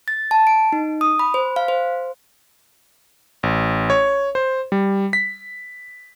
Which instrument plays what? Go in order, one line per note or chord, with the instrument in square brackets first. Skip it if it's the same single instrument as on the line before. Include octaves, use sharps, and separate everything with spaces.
[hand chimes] A6
A5
D7
D#4
D#6
B5
C5
F5
C5
[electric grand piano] A1
C#5
C5
G3
B6